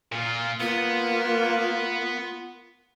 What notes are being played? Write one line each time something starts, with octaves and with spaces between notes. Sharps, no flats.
A#2 F4
A#3 B3 F4